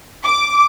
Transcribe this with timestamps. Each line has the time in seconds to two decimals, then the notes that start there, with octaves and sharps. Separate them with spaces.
0.25 D6